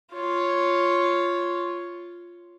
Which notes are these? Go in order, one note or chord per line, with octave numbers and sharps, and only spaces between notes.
F4 C#5